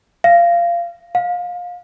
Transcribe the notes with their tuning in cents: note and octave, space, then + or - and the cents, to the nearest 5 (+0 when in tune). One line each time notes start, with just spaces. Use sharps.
F5 -20
F5 +25